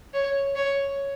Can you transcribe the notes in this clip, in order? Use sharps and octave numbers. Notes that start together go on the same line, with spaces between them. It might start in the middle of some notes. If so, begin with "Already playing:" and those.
C#5
C#5